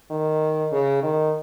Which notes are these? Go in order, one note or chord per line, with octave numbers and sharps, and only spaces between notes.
D#3
C#3
D#3